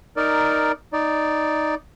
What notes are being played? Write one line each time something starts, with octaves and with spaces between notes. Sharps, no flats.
D#4 A#4 D5
D#4 D5